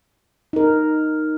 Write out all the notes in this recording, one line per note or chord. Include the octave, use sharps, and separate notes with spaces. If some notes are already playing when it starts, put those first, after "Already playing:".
D#4 A#4